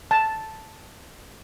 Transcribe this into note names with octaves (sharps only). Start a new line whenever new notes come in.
A5